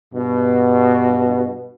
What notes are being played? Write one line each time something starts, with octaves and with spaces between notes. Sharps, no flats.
G2 B2